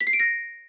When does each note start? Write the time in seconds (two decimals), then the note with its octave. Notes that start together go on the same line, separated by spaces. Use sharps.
0.01 B6
0.07 C7
0.13 D7
0.19 A#6